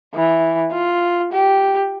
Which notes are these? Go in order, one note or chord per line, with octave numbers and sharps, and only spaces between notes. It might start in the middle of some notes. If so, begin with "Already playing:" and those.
E3
F4
G4